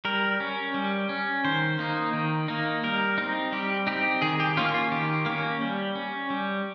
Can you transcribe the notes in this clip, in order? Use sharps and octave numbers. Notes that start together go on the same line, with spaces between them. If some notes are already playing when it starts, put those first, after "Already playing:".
G3 A#4
C#4
G3
C#4
D#3 C5
A#3 D#4
D#3
A#3 D#4
G3 A#4
C4 D#4
G3 G4
C4 D#4 G4
D#3 G#4
G4
A#3 C#4 F4
F4
D#3 G4
A#3 C#4
G3
C#4
G3